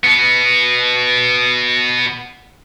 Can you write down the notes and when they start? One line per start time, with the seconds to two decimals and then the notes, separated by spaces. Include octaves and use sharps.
0.05 B2 B3